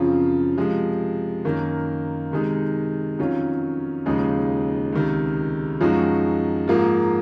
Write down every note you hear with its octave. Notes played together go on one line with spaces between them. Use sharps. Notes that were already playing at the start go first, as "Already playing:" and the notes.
Already playing: F#2 C#3 F3 C4 F4
C3 F3 G#3
F#2 D#3 A#3
C3 D#3 G#3 D#4
F2 D#3 F#3 C#4 F4
D#2 C#3 F3 G#3 D#4
C#2 C3 D#3
F#2 F3 G#3 D#4 F#4
G#2 F3 A#3 F4